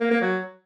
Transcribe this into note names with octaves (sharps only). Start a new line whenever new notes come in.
A#3
A#3
F#3